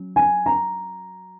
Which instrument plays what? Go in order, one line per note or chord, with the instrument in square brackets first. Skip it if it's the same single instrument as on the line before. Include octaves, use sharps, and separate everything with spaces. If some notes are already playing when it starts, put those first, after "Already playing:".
Already playing: [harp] F#3 C#4
[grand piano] G#5
A#5